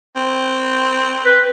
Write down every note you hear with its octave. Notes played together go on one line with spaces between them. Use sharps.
C4
B4